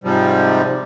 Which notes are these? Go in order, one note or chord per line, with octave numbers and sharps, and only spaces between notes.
G#2 C3 F3 G3